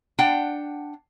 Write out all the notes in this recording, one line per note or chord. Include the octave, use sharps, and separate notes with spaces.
D4 F#5 G5